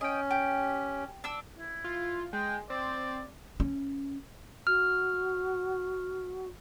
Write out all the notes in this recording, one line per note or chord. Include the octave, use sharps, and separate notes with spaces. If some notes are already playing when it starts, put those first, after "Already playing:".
C#4 D#5 G5
G4
D4 E6
E4
F4
G#3 G5
C4 D5
C#4
F#4 F6